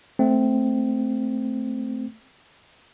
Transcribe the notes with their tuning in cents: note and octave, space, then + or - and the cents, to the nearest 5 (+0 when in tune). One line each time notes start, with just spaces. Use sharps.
A3 +0 C4 -5